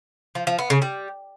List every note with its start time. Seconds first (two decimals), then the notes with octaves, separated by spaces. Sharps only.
0.35 F3
0.47 F3
0.59 B3
0.70 C#3
0.82 G3